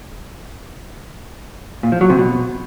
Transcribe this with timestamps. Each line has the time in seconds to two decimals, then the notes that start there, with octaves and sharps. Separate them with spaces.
1.83 A#2
1.92 F3
2.01 F#3
2.10 C3
2.19 B2